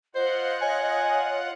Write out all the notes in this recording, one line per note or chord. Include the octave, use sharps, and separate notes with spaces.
F4 C5 D#5 F#5
C#5 G#5